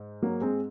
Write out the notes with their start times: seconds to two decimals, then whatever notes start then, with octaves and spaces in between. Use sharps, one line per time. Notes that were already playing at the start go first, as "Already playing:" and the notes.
Already playing: G#2
0.22 F#3 A#3
0.41 G#3 C4